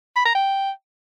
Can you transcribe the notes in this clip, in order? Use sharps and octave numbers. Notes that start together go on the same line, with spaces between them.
B5
A#5
G5